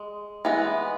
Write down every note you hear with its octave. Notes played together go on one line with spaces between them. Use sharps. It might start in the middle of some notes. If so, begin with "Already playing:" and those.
Already playing: G#3
E3 G#3 B3